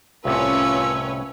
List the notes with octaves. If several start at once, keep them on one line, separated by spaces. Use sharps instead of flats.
C2 A2 C3 C#4 F4 B4 C#5 E6